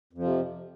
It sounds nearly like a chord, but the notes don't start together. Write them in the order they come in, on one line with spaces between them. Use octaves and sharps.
F2 F3 C3